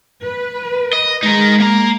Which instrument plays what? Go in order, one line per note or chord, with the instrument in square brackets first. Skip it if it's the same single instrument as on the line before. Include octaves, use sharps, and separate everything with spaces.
[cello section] B4
[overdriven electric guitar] D#5
[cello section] G#3 [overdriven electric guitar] D#4 A#4
[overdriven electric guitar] A#3 A#5